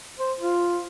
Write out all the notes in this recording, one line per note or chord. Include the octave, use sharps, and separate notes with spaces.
C5
F4